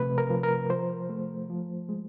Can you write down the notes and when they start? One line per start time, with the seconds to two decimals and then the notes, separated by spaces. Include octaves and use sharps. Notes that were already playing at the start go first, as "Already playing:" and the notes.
Already playing: C3 F3 A3 B4
0.18 A#4
0.30 F3
0.43 A#4
0.70 F3 C5
1.09 A3
1.50 F3
1.89 G#3